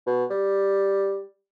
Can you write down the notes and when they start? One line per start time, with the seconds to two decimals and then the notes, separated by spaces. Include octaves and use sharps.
0.07 B2
0.30 G3